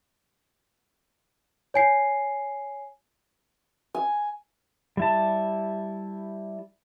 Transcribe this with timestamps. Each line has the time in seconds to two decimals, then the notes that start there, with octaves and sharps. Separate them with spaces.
1.74 C#5 G#5 C7
3.95 G#5
4.97 G3 E4 A5